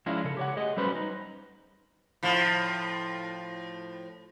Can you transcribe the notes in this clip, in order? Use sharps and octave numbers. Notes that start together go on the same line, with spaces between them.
F3 G#3 C#4 D4 E4 F4
C#3 A4
G4 C#5 F#5
A3 G#4 D#5
F#3 G3 C#4 B4 C5
D#4
A2 F3